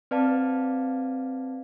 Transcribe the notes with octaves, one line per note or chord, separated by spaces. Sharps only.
C4 B4 D5 F5 A5